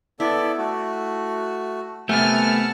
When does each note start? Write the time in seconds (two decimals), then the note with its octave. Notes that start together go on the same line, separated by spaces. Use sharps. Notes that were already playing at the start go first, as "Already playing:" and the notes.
0.20 B3 E4 A4 D5
0.58 A3 F#4
2.09 C3 A3 B3 F#5 G#5 A5 F6